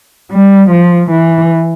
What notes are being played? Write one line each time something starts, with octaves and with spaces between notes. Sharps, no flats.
G3
F3
E3